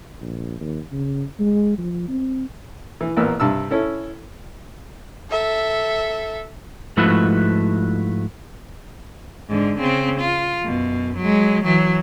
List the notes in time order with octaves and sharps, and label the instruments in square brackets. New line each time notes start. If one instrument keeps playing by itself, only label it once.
[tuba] A#1
D#2
C#3
G#3
F3
C4
[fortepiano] E3
A1 A#2 A#3 B3 E6
G2 C3 A5 E6
C#4 E4 A4
[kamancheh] A4 E5
[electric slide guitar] G#2 F3 A3 E4 F#4 B4
[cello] G#2 D3
C#3 C4
F4
F#2 B2
F#3 G#3
E3 F#3